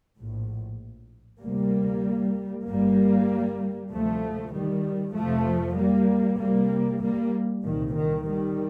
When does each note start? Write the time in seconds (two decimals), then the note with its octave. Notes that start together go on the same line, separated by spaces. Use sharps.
0.17 A#1 A2
1.42 D2 C3 G3 A#3
2.67 G1 G2 G3 A#3
3.92 D2 C3 F3 A3
4.53 D#3 G3
5.16 F1 F2 C3 F3 A3
5.77 G3 A#3
6.40 C2 C3 G3 A#3
7.02 G3 A#3
7.65 C2 A#2 D#3
7.96 D#3
8.27 D#3 G3